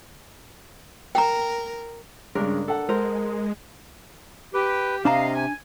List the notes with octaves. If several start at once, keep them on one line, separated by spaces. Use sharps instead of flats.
A#4 G5 A#5
G2 C#3 G#3 D4 A#4
A4 F#5
G#3 A#4 C5
G4 B4
C3 D4 D#5 F5 A5 A#5
G#5